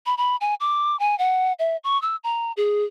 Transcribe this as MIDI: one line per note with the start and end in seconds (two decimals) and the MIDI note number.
0.06 0.15 83
0.18 0.36 83
0.41 0.55 80
0.60 0.99 86
1.00 1.17 80
1.19 1.53 78
1.59 1.77 76
1.84 2.00 85
2.02 2.16 88
2.24 2.52 82
2.57 2.84 68